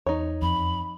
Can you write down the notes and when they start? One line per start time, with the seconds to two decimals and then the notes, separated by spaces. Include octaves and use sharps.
0.06 E2 D#4 C#5
0.42 F2 B5